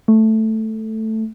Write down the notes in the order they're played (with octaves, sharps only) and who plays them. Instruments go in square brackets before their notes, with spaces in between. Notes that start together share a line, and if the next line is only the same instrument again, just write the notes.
[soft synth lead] A3